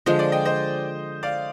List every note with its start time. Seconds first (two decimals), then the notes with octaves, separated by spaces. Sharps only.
0.06 D3 F3 G#3 C5 D#5
0.19 D5
0.32 D#5 G5
0.45 C5 D#5
1.23 D5 F5